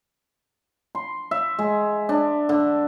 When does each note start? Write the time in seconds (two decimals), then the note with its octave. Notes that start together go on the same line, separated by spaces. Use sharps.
0.95 C6
1.31 E5
1.59 G#3
2.09 D4
2.49 D3